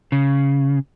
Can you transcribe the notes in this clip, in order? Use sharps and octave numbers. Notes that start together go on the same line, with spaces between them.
C#3